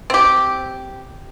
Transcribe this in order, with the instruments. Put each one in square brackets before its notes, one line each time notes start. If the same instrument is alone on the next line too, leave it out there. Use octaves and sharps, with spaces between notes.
[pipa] C4 G4